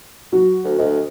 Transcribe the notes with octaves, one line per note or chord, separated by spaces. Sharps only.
F#3 F#4
D2
D2 D#5